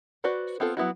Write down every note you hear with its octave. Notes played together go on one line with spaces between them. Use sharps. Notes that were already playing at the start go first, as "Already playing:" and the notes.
F#4 B4 C5 D5 F#5
B3 C4 F4 A4
F#3 B3 E4 F#4